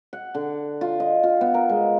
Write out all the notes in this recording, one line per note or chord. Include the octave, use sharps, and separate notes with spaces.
F#5
D3
F4
D#5
F4
B3
A#4
G#3